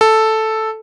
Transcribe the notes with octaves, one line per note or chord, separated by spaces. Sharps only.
A4